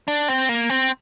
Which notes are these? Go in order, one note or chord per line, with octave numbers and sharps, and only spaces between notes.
D4
C4
A#3
C4